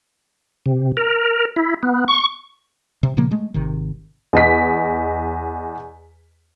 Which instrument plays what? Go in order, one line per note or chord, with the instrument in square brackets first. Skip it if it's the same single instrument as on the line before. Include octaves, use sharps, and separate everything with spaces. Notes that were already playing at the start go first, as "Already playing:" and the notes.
[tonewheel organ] C3
A#4
E4
B3
C#6
[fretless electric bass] C3
A#2 C#3 F3 A#3
G#3 A3
G#1 C3 D#3
[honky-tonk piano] E2 D#5 B6